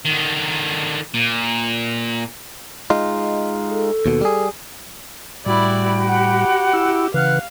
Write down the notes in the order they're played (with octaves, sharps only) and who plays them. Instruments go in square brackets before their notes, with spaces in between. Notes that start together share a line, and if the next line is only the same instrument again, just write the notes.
[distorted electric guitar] D3 D#3
A#2
[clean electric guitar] G#3 D#4 F4
[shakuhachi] A4
[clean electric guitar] D#2 B2
G3 G#4
[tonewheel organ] A2 G3 [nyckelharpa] E4 D5 [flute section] F#4 G5 B5
[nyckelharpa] G4 [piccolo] F#5
[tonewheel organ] E4 E6
[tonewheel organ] C#3 E3 B4 [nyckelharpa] F5 [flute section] F#5 F6 F#6